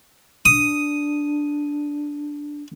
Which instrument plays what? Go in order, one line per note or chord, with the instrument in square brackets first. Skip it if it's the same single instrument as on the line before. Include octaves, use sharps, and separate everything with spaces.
[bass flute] D4 [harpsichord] D#6